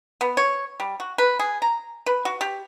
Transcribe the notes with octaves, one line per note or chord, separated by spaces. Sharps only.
B3
C#5
G3
F#4
B4
G#4
A#5
B4
F#4
G4